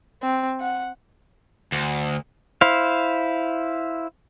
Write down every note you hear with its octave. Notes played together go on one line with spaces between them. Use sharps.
C4
F#5
D2
E4 C5 F5